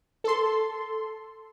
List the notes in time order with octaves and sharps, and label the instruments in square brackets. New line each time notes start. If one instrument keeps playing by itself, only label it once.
[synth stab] A4 C6